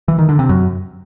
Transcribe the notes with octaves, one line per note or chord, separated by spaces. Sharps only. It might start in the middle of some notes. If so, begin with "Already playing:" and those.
E3
D#3
D3
C3
F#2